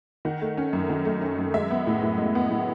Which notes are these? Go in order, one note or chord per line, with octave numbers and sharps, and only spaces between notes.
D#3 F#5
A3
C#4
F#2
D#3
A3
C#4
F#2
G#3 E5
B3
A2
A2
G#3
B3
A2